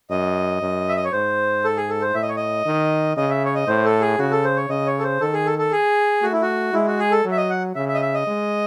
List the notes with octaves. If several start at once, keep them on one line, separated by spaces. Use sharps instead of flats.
F#2 D#5
F#2
E5
D#5
C#5
G#2 C5
A4
G#4
A4
C5
A2 E5
D#5
C#5
D#5
D#3
C#3 D#5
E5
C#5
D#5
A2 C5
A4
G#4
C#3 F#4
A4
C5
C#5
C#3 D#5
C#5
A4
C5
D#3 A4
G#4
A4
A4
G#4
A3 F#4
E4
F#4
G#3 E4
F#4
G#4
A4
F#3
E5
D#5
F#5
C#3 E5
E5
D#5
E5
D#5
G#3